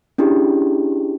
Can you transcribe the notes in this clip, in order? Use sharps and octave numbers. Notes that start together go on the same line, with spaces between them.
C#4 D4 E4 G4 G#4